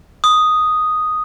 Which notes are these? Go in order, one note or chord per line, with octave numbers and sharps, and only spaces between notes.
D#6